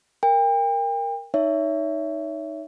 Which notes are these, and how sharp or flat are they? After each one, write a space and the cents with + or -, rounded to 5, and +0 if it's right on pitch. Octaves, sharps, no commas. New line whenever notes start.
A#4 +0 G5 +35
D#4 +0 C#5 +25 E5 +5